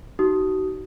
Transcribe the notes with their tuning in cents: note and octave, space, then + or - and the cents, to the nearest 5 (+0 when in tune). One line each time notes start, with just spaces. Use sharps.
D#4 +0 F#4 +35 D#6 +0